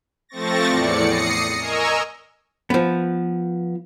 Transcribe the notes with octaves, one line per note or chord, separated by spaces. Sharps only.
F3 A3 C4 C#6 A6 A#6
E2 A2 D5 C#7
D#6 A#6 C7 C#7
A#4 D#5 G#5 A#5 C#6 E6
F3 B3